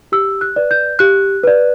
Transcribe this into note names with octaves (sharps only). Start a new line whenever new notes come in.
G4 E6
F#6
B4 D5
G6
G4 F#6
B4 D5